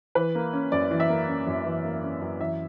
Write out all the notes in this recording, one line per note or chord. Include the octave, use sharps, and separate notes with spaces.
E3 B4
A#3
C#4
F#2 D5
E3
E5
A#3
C#4
F#2
E3
A#3
C#4
F#2
E3 E5